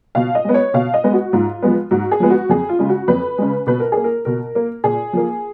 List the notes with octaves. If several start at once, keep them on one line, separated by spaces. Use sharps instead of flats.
B2 F5
D#5
G#3 B3
C#5
B2 F5
D#5
G#3 B3
F#4
G#2 F4
F3 G#3 B3
G#2 F#4
G#4
F3 G#3 B3
F#4
F2 G#4
F4
C#3 G#3
F#4
F2 B4
C#3 G#3
B2 B4
A#4
A#3 G#4
A#4
B2 A#4
A#3
A#2 G#4
F3 A#3